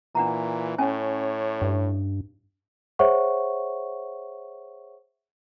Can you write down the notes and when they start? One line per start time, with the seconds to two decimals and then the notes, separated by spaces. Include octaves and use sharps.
0.15 A#2 E3 D4 F#5 A#5
0.78 A2 C#4 C#5 G#5
1.62 G2
2.99 G#4 C5 C#5 E5 F#5 C#6